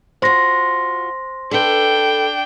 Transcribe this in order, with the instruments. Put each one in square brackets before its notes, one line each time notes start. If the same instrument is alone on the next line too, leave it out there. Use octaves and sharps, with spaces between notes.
[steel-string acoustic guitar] F4 F#4 [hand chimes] C5 C6 A#6
[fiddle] D4 G5 [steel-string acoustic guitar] A4 B4